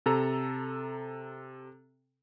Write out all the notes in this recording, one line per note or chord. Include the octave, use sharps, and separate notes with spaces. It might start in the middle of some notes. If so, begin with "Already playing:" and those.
C3 A4 A#5